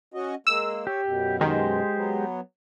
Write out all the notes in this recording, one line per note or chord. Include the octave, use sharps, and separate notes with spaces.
C#4 F#4 D#5
G#3 A#3 E6
G4 C#5
F#2 B2
D#3 G#3 G4 C5
F#3 B3